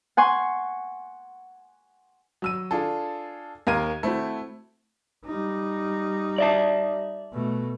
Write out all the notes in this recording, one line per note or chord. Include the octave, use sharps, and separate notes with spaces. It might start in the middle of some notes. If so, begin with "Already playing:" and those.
F#5 G#5 C6 C#6
F#3 E6 D#7
D4 F4 G#4 A4
D#2 A#4 F5 A#5 G#6 D#7
A3 C4 E4 F#4
G3 D#4
D5 E5 A5
B2 A3